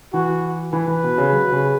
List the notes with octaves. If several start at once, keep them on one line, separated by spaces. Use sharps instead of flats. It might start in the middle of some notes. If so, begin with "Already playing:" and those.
E3 F#4
E3 B4
E3
B2
C#3
F#3
C#3